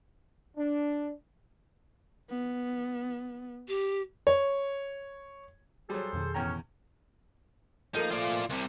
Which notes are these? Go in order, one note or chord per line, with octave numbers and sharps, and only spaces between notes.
D4
B3
G4
C#5
F#3 G3 G#4 A4 C5
F2 B2 D#3
E2 A2 C#4 G5 A#5
F3 A3 A#3 D#4
F4 D5
C2 C3